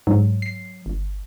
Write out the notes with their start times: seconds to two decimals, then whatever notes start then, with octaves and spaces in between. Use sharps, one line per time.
0.07 G#2 F#3
0.42 C7
0.86 G1